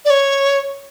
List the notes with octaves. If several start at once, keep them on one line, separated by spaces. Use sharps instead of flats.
D5
C#5